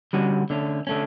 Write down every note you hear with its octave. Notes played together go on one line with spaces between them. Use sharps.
D3 G3 C#4 F#4
D3 A3 C#4
D3 A3 C#4